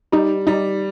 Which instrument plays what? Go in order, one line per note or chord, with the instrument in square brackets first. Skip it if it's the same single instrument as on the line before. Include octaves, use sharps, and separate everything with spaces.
[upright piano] G3 [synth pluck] D#4
[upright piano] G3 [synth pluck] D#4